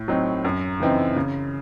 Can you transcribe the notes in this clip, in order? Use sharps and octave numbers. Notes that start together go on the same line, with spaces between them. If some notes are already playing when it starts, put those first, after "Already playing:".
Already playing: A2
F#3 C4 D#4
F#2
C#3 E3 C4 D#4
C#3